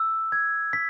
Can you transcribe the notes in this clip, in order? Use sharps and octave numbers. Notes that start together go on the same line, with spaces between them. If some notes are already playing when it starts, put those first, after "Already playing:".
Already playing: E6
G#6
B6